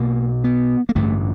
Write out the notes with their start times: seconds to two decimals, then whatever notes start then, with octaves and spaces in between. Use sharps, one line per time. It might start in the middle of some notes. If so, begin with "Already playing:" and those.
Already playing: B1 B2 A#3
0.44 B3
0.89 A#3
0.95 A1 G2 D3 A3